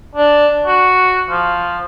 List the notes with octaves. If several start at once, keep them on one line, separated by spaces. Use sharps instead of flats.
D4
F#4
F3